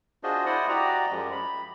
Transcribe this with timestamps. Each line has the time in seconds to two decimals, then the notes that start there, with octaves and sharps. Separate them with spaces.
0.24 D4 F4 F#4 G#4 C5 D#5
0.46 E4 C5 D5 D#5 F#5 D#6
0.69 F#4 G4 D5 D#5 A#5
1.11 F#2 F3 G#3
1.32 B5